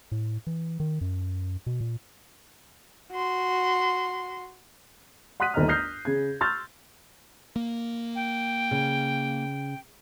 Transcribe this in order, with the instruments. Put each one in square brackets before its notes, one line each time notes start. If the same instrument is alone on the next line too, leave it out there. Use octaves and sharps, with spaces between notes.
[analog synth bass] A2
E3
D#3
F#2
B2
A#2
[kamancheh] F#4 C6
[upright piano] F#5 C6 D#6 F#6 B6 D#7
G1 D#2 A3 D#5 A#5 F6
D#6 F6 G6 A#6 C7
C#3 G#4 G#6
C6 C#6 E6 F6 G6 A6
[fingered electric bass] A#3
[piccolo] G5
[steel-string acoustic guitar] C#3